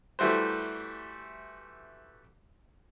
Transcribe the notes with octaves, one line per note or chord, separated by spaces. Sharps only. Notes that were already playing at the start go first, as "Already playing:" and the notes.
E3 G3 A3 F#4 C5